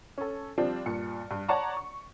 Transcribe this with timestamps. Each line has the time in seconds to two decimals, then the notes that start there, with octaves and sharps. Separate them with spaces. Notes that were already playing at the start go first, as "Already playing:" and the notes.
0.18 C#4 A4
0.58 F3 G3 C4 D4 F4
0.86 G2 A#2 C#7
1.31 G2
1.48 C#5 D5 F#5 A5 A#5 C#6
1.77 C#6